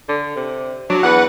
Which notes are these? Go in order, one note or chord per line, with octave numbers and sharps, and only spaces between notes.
D3
C3
F#3 D4
E2 B4 F#5